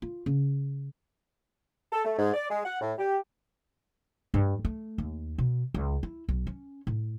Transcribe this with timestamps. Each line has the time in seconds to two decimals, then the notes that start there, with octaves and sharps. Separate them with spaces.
0.02 F4
0.26 C#3
1.93 A4
2.05 A3
2.18 G#2
2.34 D5
2.50 G#3
2.65 F#5
2.81 A2
2.98 G4
4.34 G2
4.65 A3
4.98 D#2
5.38 B2
5.74 C#2
6.03 E4
6.29 B1
6.47 C#4
6.87 A2